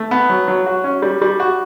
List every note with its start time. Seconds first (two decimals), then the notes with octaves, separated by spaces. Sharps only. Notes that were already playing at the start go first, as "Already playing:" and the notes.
Already playing: A3
0.11 B3
0.29 F#3
0.48 F#3
0.66 F#4
0.84 C#4
1.02 G3
1.22 G3
1.40 F#4